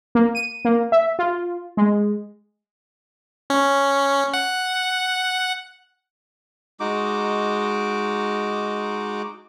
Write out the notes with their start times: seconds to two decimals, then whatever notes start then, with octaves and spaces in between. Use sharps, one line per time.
0.15 A#3
0.35 D#7
0.65 A#3
0.92 E5
1.19 F4
1.77 G#3
3.50 C#4
4.33 F#5
6.80 G#3 D#4 F#4 D6